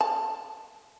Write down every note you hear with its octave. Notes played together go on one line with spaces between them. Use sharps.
A5